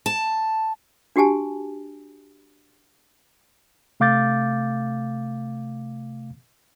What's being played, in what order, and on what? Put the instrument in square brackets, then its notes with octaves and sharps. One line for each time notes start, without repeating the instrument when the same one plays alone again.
[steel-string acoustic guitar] A5
[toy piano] D4 F#4 G4 G#5 A5
[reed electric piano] C3 A3 F5 D6 G6 A6